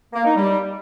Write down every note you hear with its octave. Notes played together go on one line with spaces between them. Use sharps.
A#3
D#4
G3